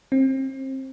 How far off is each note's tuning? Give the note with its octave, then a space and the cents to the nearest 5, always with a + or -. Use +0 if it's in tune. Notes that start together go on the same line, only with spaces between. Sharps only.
C4 +25